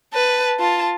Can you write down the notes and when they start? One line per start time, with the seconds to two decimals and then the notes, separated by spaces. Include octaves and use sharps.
0.13 B4 A5
0.59 F4 A5